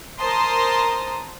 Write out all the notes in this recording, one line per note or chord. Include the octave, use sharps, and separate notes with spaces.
A#4 C5 A5 A#5 C6 D#6